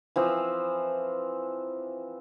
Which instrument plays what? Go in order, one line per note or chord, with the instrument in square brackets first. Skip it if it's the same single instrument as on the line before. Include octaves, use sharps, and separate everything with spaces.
[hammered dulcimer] E3 F3 C4